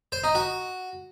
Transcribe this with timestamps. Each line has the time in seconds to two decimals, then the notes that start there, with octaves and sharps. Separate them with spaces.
0.12 C5
0.24 D#4
0.35 F#4